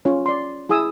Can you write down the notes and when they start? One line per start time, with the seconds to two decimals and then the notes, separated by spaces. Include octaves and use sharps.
0.05 C#4 F4 C#5
0.26 D5 C6
0.69 E4 G#4 G#5 D#6 E6